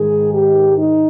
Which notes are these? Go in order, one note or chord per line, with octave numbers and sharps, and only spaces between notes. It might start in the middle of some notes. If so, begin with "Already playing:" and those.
Already playing: G#2 D#3 G#4
G4
D#4